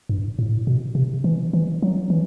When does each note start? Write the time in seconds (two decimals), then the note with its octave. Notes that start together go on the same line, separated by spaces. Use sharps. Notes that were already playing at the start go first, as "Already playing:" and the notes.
0.09 G2
0.39 A2
0.67 B2
0.95 C3
1.24 E3
1.53 E3
1.82 F#3
2.10 E3